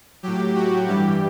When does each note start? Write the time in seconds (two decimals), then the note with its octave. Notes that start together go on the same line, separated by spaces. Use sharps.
0.23 A2 F#3 G4
0.55 F#4
0.88 G2 E3 G3 G4